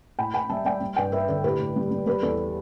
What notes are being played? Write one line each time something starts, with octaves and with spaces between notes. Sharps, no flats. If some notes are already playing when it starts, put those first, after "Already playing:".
A2 G5 B5
A2 G5 B5
G3 E5 A5
G3 D5 G5
G3
G2 D5 G5
G2 B4 E5
D3 A4 D5
A2 G4 B4
A2
G3
G3
G3 G4 B4
E2 A4 D5